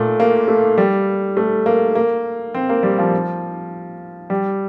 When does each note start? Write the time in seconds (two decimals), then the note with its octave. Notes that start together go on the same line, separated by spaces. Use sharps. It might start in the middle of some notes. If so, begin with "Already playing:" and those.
Already playing: A#2 A3
0.20 A#3
0.48 A3
0.78 G3
1.37 A3
1.66 A#3
1.95 A#3
2.54 C4
2.69 A#3
2.83 G3
2.99 F3
4.30 G3